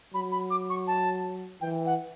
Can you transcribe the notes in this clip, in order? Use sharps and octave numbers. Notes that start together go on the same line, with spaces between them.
F#3 B5
B5
D6
C#6
A5
E3 G5
F#5